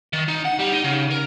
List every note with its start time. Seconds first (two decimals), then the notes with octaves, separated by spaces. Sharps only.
0.13 D#3
0.28 D#4
0.44 F#5
0.59 G3
0.72 D#4
0.84 C#3
1.11 A#4